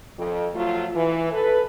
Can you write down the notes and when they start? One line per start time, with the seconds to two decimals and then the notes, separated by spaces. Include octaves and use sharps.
0.18 F2
0.54 F3 F#3 A3 F4
0.95 E3
1.32 A4 B4